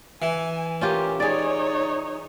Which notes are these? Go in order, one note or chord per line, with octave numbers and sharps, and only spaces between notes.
E3 G#5
C#4 F4 G4 A#4
D#4 G#4 C#5 D5